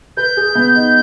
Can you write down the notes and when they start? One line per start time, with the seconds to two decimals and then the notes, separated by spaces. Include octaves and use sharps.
0.17 B4 G6
0.37 G#4
0.55 B3
0.75 D#4